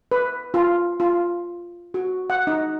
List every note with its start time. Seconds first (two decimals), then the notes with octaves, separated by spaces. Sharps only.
0.12 B4
0.54 F4
1.00 F4
1.94 F#4
2.30 F#5
2.47 D#4